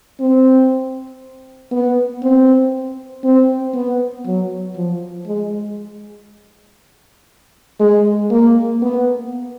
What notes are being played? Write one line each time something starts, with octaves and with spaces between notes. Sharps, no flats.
C4
B3
C4
C4
B3
F#3
F3
G#3
G#3
A#3
B3